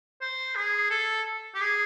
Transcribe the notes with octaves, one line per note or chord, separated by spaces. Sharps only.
C5
G#4
A4
G4
G#4